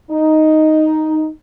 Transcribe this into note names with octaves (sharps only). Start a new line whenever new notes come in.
D#4